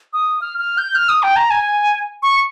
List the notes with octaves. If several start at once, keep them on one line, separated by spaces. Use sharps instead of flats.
D#6
F6
F6
G6
F6
D#6
G5
A#5
G#5
C#6